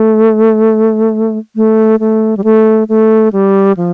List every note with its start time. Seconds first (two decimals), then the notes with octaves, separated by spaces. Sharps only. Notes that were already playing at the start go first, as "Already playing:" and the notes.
Already playing: A3
1.56 A3
2.00 A3
2.37 G3
2.44 A3
2.89 A3
3.33 G3
3.77 F3